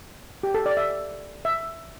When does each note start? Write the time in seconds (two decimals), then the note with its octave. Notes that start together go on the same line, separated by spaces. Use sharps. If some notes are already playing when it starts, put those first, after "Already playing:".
0.43 G4
0.54 A4
0.66 D5
0.77 E5
1.45 E5